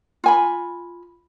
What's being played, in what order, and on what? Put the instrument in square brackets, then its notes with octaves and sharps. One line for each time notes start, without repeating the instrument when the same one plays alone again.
[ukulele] F4 G#5 B5